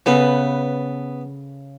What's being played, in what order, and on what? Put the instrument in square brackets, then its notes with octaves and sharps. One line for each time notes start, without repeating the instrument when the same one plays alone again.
[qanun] C#3 A4 B4 [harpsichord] B3